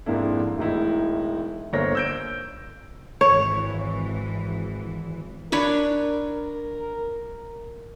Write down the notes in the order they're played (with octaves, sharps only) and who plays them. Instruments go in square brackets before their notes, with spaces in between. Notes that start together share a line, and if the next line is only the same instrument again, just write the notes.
[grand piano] F2 G#2 A#3 D4 E4
E1 A2 D#4 E4
G1 A#3 C5 C#5 A#6
E6 G6 D7
[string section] G#1 E3 [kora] C#5
[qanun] D4 B4 C#5 [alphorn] A#4